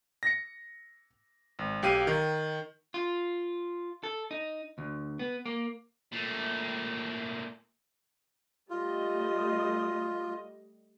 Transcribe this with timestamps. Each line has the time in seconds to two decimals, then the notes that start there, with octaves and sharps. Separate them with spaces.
0.23 A#6 C#7
1.59 G#1
1.83 B1 G4 F5 D#7
2.07 D#3
2.94 F4
4.03 A4
4.31 D#4
4.78 D2
5.19 B3
5.46 A#3
6.13 A#2 A3
8.70 G3 A3 F4 D#5